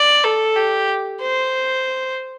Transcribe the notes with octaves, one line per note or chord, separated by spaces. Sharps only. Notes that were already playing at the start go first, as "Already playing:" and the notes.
Already playing: D5
A4
G4
C5